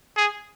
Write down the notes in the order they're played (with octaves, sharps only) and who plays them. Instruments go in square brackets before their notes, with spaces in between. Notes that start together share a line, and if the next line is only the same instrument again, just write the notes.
[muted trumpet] G#4